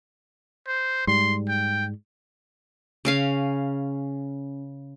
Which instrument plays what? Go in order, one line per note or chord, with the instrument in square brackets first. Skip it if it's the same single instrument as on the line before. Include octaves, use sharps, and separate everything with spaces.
[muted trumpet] C5
[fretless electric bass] G#2 G3 [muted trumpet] C6
[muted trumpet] G5
[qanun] C#3 C#4 F5